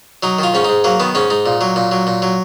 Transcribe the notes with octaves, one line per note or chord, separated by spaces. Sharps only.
F#3 D#4
D#3 F4
G#2 C#4
G#2 D#4
F#3 A#3
D#3 B3
G#2 C#4
G#2 D#4
A#2
F#3
A#2
F#3
A#2
F#3